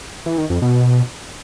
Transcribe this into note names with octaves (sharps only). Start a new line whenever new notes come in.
E3
D#3
F2
B2